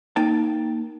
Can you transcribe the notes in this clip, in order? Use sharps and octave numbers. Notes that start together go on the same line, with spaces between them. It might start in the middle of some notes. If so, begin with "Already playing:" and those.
A#3 D#4 G5 A5